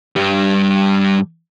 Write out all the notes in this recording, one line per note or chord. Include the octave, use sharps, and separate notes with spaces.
G2 G3